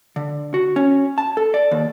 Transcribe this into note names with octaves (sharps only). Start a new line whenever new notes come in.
D3
F#4
C#4
A5
A4
D5
D#2